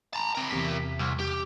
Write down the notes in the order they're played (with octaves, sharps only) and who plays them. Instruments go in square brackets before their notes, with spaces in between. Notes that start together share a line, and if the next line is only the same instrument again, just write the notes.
[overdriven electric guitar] A5 A#5
C4 A#4
[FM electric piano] E2 C3 B6
[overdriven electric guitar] C2
G4